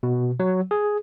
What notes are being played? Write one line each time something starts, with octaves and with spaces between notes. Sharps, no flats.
B2
F#3
G#4